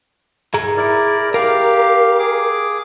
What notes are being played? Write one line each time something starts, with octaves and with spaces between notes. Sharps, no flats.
G#4 A#5
E4 A#4 D5
G4 A#4 F5
G#4 D6